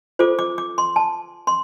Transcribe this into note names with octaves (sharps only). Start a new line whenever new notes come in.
F4 A4 C5 D6
D6
D6
C6
A5
C6